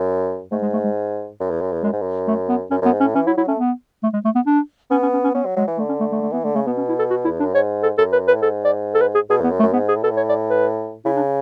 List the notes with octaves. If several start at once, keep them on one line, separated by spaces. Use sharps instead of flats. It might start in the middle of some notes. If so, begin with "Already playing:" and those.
Already playing: F#2
G#2 A3
G#3
A3
G#3
F#2
E2
F#2
E2
F#2 G#3
G#2
F#2
A3
B3
F#2 C#4
F#2 B3
G#2
C#4
A2
E3 C#4
F#3 E4
F#3 E4
A3 C#4
B3
A3
G#3
A3
B3
D4
B3 C#4
C#4
C#4
C#4
B3 C#4
F#3
F#3 G#3
E3
D3 A3
C#4
A3
A3
A3
E3 B3
D3 A3
C#3 A3
B2 B3
C#4
E4
A4
F#4
E2 E4
F#2 D4
G#2 C#5
A4
F#2 A4
B4
B4
A2
G#2 A4
D5
A4
B4
G#4
B2 G#4
E2 B3
F#2
A3
F#2
G#2 B3
G#4
A2
B2 A4
A2
C#5
D5
B4
C#3 E4
D4